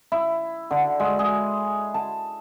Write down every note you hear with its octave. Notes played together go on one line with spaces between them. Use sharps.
E4
D3
G#3
G#4
A5